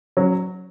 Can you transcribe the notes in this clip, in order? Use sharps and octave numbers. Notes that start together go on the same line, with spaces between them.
F#3 C#4